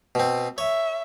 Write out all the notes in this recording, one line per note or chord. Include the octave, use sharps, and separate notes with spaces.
B2 C4
C#5 E5